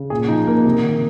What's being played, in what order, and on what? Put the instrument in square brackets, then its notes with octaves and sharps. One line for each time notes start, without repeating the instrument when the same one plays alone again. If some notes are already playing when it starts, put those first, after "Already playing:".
Already playing: [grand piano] C#3
A#2 G#4
F3 D#4
A#2 A#3
C3
D#3